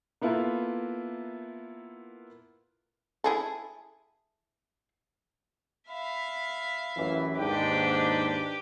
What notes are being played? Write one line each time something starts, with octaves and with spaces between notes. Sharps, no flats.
A#3 B3 E4 F4 A4 A#4
E4 G#4 A4
E5 F5 B5
A1 F#2 E3
D#2 G#2 D4 G4 B4 G5